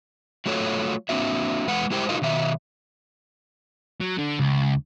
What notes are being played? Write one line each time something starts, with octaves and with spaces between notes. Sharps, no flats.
F#3 A3 F4 F#4 A4 C#5
A#3 C4 D4 F#4 E5
E2 G#3 B4 F#5
G#3 E4 G4 A#4 C5 G5
D#4 F4 F#4 A#4 D#5 F5
B2 D#3 F#3 E5
F#3
D3
C#2